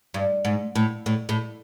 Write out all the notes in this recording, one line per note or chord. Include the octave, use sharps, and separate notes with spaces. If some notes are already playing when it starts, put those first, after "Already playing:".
G2
G#2
A2
A2
A2